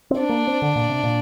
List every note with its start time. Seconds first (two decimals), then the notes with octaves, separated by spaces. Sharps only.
0.11 C4
0.20 D4
0.29 A#3
0.47 C4
0.62 D3
0.76 A#2
0.89 C3
1.03 A#2